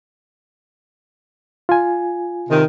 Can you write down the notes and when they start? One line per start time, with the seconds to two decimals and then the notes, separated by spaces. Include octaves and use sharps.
1.69 F4 G#5
2.49 C3 D#3